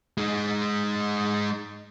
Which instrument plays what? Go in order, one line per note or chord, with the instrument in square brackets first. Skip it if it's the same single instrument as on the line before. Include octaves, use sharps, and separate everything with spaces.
[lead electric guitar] G#3 D#4